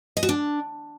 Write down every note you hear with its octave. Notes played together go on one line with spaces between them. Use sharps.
D#5
F#4
D4